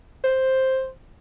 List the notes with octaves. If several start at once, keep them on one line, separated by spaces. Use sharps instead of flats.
C5